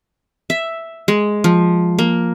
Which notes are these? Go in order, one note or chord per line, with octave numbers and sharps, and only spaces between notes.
E5
G#3
F3
A#3